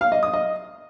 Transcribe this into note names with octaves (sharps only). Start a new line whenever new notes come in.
F5
D#5
D#6
D#5